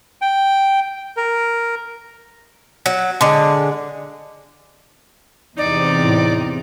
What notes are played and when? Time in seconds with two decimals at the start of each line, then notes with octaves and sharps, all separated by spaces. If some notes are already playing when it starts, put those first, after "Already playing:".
0.21 G5
1.17 A#4
2.86 F#3
3.21 D3 G#3
5.58 E2 C3 D#4 D5
6.02 A2